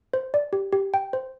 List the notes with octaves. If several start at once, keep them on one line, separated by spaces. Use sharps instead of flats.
C5
D5
G4
G4
G5
C5